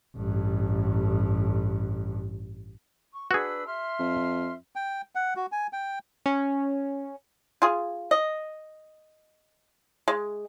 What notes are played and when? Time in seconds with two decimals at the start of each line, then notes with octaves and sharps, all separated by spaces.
0.17 A1 G2
3.12 C#6
3.31 D4 F#4 G#4 B4 E6
3.66 E5 C6 F6
4.00 F2
4.75 G5
5.15 F#5
5.36 F#4
5.52 G#5
5.73 G5
6.26 C#4
7.62 F4 G#4
8.11 D#5
10.08 G#3